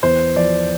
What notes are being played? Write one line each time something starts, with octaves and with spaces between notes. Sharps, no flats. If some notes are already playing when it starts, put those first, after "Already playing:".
E2 C5
F3 D5